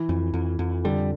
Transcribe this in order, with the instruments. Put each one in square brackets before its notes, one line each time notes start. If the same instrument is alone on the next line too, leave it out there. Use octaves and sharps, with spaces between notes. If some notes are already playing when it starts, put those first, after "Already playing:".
Already playing: [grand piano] E3
[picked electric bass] F2
F2
F2
[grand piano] D3 [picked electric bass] G3